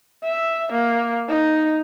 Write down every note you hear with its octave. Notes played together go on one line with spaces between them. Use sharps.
E5
A#3
D#4